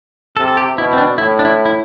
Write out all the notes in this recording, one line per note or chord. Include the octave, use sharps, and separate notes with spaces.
C3 A4
A4
G4
B2 E4
C4
D4
A2 E4
D4
E4
E4